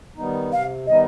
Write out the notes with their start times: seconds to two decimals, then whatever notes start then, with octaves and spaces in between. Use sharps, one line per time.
0.17 D#3 G3 B3 D#4
0.52 C3 F5
0.87 D#3 G3 B3 D#4 D#5